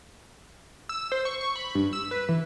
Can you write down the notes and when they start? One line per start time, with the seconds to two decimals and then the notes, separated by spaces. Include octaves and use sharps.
0.89 E6
1.12 C5
1.25 C#6
1.41 C#6
1.56 B5
1.75 G2
1.93 E6
2.11 B4
2.29 E3